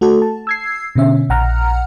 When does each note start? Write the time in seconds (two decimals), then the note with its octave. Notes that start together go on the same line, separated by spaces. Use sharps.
0.01 A3 F#4 A4
0.22 A5
0.47 E6 G#6 C7
0.96 B2 D3 C#4 E5
1.29 A#1 F#5 A#5 F6